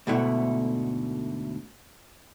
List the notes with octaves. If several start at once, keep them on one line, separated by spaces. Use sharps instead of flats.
D2 G#2 B2 A3 E4 F#5